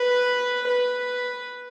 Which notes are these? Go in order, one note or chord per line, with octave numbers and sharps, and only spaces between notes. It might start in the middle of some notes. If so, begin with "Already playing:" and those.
Already playing: B4
B4